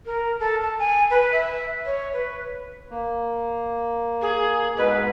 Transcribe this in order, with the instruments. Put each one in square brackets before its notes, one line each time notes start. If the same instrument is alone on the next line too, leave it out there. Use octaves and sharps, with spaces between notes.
[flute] A#4
A4
A5
G#5
B4
E5
C#5
B4
[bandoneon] A#3
[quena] G#4
[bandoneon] G#2 B2 [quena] B4